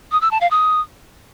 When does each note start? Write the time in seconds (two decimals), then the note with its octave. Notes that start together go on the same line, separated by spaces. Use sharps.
0.12 D#6
0.21 E6
0.31 A5
0.41 F5
0.51 D#6